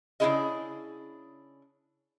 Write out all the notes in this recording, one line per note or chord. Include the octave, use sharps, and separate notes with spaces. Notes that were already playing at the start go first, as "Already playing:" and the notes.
C#3 B3 D4 E4 G#4 D#5